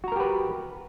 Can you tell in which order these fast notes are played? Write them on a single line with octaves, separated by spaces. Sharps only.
F#4 A#5 A#4 G4 B4